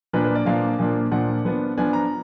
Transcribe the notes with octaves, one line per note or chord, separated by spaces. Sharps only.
A#2 F3 A#3 D4 B4
B4
D5
A#2 F3 A#3 D4 F5
A#2 F3 A#3 D4
A#2 F3 A#3 D4 F#5
F3 B3 D4
F3 B3 D4 G#5
A#5